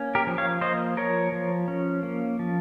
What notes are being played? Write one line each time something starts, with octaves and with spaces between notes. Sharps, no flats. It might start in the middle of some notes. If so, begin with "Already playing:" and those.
Already playing: A#3 C#4
G4 A#4
F3
C#5 F5
A#3 C5 D#5
F3 A#4 C#5
F3
C#4
A#3
F3